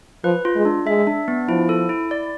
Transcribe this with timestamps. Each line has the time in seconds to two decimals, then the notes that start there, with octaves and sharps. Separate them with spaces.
0.24 F3 B4
0.45 F4
0.56 G#3
0.65 D4
0.86 G#3 E5
1.07 D4
1.28 B3
1.48 F3 E4
1.69 A4
1.89 E4
2.11 D5